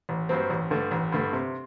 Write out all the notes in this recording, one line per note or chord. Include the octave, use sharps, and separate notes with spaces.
A1
G2 F#3 C4
A1
G2 D3 A3
A1
G2 D3 A3
C3